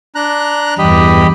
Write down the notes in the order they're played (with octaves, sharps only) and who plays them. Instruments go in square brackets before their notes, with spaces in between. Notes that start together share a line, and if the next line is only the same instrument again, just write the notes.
[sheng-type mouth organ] D4 A#5 F#6
[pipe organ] E2 G2 [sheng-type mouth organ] G4 D#5 B5